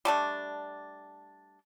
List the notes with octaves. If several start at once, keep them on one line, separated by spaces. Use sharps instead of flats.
G3 A3 D4